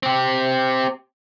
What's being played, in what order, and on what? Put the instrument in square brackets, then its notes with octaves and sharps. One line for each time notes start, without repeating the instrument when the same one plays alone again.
[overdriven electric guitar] C4 G4